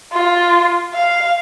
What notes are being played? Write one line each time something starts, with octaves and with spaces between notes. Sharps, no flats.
F4
F5